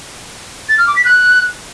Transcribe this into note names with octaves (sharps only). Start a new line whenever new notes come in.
A6
F6
D6
B6
F#6